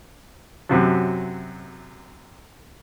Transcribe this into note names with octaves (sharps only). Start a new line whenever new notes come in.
F#2 C3 F#3